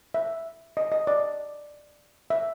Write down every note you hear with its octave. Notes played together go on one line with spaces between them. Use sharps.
E5
D#5
D#5
D5
E5